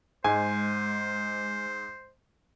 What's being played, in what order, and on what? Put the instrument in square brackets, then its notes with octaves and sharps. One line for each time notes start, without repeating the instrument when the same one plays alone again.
[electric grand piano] G#2 [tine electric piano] G#3 [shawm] C5 [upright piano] G#5